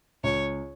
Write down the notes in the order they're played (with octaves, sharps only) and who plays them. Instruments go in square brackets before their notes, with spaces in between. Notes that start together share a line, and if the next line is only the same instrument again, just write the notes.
[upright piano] C#2 [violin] C#5